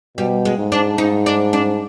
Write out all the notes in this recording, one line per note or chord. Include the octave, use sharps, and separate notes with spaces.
B2 G3
G#3
G#2
D4
G#2 D#4
D4
D4